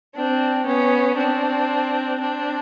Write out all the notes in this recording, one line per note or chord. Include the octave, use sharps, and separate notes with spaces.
C4 D4
B3 C#4
C4 D4
C4 D4